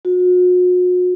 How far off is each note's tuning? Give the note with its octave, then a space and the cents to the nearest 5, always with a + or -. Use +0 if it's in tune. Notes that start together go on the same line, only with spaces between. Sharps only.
F#4 -40